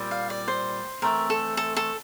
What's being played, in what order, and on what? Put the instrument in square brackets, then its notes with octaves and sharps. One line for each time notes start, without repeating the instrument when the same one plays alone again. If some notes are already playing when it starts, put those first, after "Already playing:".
Already playing: [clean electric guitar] A#2 G3 C4
[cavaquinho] F5
D5
C5
[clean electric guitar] E3 A3 C4 [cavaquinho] A#4
[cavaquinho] A4
A4
A4